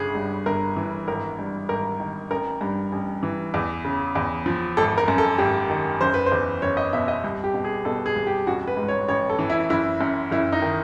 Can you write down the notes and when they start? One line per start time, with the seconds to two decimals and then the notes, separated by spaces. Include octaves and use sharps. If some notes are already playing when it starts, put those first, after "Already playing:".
Already playing: G1 C#3 G#4
0.15 G2
0.46 G1 A#4
0.76 E3
1.07 G#1 A#4
1.39 G2
1.69 G#1 A#4
2.00 D#3
2.31 A1 A#4
2.61 G2
2.92 A1
3.23 E3
3.54 E2
3.85 C#3
4.15 E2
4.46 F3
4.77 G#1 A4
4.98 A#4
5.08 F#2
5.18 A4
5.38 G#1 G4
5.69 D#3
6.01 F#1 C5
6.14 B4
6.26 C5
6.31 E2
6.62 F#1 C#5
6.77 D#5
6.93 B2 E5
7.08 D#5
7.24 C2
7.44 G4
7.54 B2
7.64 G#4
7.85 B2 A4
8.06 G#4
8.16 C2
8.27 G4
8.47 A1 F#4
8.68 B4
8.77 G#2
8.88 C#5
9.08 A1 C#5
9.30 A4
9.39 E3
9.50 E4
9.70 F#1 E4
10.01 F#2
10.31 F#1 E4
10.52 D#4
10.62 D#3